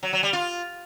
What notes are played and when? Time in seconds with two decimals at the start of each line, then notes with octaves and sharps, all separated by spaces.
0.03 F#3
0.13 F#3
0.23 G3
0.33 F4